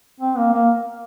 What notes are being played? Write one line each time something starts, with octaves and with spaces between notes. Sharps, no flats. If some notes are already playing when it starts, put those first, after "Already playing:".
C4
A#3
A#3